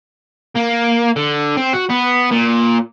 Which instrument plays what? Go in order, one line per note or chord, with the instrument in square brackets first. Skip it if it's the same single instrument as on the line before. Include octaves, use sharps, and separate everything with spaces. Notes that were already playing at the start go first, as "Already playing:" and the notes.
[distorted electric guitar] A#3
D3
C4
F#4
B3
A#2